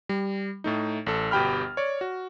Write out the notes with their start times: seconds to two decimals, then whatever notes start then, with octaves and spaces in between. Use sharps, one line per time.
0.09 G3
0.64 A2 A3 D#4
1.06 A1 A4
1.31 G1 B2 G4 G5 B5 F6
1.77 C#5 D5
2.01 F#4